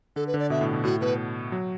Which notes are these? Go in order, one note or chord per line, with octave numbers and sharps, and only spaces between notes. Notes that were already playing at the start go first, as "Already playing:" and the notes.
D3 A4
B4
D3
D5
B2 E5
A2
B2
A2 F#4
B2 B4
F#3